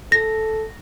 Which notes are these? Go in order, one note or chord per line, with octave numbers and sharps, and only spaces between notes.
A4 A#6